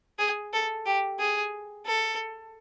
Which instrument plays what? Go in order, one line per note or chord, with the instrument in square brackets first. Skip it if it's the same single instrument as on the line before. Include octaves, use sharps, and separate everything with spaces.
[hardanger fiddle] G#4
A4
G4
G#4
A4